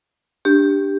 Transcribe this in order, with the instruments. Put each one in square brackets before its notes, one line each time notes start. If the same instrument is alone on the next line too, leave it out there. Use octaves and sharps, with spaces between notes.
[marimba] D4 [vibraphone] G4